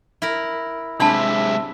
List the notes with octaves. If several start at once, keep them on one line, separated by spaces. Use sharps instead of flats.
E4 A#4
C3 G#3 D4 E5 A5 B5